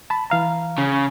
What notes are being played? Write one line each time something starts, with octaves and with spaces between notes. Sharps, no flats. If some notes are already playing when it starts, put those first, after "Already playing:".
A5 B5
E3 F5 A#5
C#3